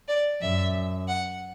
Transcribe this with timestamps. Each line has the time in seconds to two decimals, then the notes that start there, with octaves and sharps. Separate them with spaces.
0.08 D5
0.41 F#2 E5
1.08 F#5